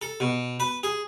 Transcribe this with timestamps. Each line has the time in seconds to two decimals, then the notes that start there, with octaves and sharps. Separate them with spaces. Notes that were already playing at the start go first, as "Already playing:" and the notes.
0.02 A4
0.20 B2
0.60 B4
0.83 G#4